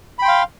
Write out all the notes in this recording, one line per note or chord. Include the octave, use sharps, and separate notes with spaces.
F5 G5 B5 C6